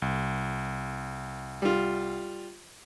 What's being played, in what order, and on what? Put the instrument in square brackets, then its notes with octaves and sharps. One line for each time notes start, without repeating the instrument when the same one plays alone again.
[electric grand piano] C2
[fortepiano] G3 F4